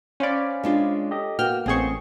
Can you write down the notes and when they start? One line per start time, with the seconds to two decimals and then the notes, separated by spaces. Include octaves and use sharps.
0.20 C#4 C5 D5 F5 B5
0.64 G#3 D4 F4
1.11 G4 A4 D#5
1.39 A#3 B3 F#4 G5 F6
1.66 A1 C4 G#4 C5 C#6